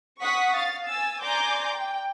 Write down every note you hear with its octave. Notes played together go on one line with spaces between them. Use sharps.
F#5 C#6 D#6 B6
F5 A6
G#5 E6 A6
D5 G#5 A#5 C6 D6 G6
G5